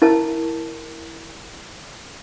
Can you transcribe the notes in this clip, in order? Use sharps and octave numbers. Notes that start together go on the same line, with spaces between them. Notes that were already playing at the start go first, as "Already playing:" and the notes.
E4 A#4 A5